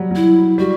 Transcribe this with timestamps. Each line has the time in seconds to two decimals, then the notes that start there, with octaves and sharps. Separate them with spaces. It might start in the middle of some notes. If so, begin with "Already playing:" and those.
Already playing: F#3 G3
0.11 F#3 E4
0.58 G3 F#4